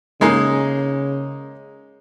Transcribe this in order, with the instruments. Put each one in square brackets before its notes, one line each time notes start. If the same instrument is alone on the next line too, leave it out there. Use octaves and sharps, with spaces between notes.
[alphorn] C#3 [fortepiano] G#3 A#3 D#4